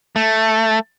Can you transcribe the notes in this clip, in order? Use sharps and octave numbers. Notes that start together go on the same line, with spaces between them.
A3